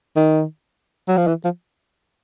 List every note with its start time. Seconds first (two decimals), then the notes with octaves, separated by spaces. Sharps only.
0.16 D#3
1.08 F#3
1.17 F3
1.27 E3
1.44 F3